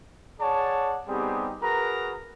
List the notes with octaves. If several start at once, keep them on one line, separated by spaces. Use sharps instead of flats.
G#4 C#5 D5 F#5 A5
G3 B3 C4 D#4 G4 G#4
F#4 G#4 A#4 B4 A#5